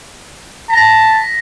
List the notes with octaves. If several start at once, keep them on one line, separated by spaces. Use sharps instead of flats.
A5 A#6 B6